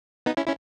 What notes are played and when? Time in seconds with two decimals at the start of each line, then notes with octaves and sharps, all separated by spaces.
0.26 B3 D#4
0.37 C#4 E4
0.47 C#4 E4